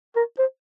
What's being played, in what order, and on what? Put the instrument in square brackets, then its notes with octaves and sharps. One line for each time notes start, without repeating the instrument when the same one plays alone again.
[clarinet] A#4
C5